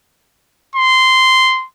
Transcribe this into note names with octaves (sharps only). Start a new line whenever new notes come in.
C6